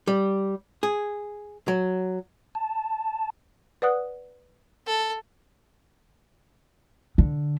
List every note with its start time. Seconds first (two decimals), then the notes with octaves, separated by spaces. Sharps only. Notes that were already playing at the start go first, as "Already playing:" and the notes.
0.07 G3
0.83 G#4
1.68 F#3
2.55 A5
3.82 B4 D5 F#5 D#6 F#6
4.86 A4
7.18 D3